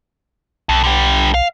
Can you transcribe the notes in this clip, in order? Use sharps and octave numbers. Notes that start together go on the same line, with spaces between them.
B1 F2
D3 G3
F5